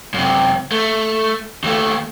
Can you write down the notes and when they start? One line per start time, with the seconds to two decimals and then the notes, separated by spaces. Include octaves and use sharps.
0.14 F#2 C3
0.72 A3
1.64 D#2 A3